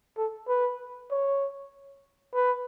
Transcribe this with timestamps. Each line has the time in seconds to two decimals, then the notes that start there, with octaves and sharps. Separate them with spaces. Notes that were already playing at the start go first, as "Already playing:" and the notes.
0.17 A4
0.48 B4
1.11 C#5
2.34 B4